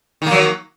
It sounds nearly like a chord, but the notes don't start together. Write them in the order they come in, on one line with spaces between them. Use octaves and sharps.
D#3 A#3 F#3